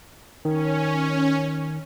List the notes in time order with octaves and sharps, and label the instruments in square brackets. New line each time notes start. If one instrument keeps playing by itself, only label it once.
[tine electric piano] D#3 [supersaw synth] C#4